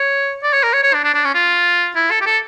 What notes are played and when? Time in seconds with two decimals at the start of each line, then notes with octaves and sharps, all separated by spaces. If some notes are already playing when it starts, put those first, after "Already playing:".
Already playing: C#5
0.43 D5
0.53 C#5
0.63 A#4
0.73 C#5
0.83 C#5
0.94 D4
1.04 D4
1.14 D4
1.25 C#4
1.34 F4
1.96 E4
2.11 A4
2.21 G4
2.26 A4